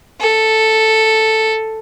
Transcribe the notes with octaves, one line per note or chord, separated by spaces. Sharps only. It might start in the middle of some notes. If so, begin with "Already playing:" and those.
A4